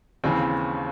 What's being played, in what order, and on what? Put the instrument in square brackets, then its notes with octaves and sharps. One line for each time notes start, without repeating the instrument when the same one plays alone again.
[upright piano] D#2 C#3 E3 C4